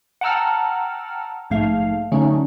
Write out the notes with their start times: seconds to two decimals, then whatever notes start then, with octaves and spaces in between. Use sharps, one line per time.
0.21 F#5 G5 A5 A#5 E6 F6
1.50 A#1 G#2 A3 F5
2.12 D3 F#3 A3 C#4 D#4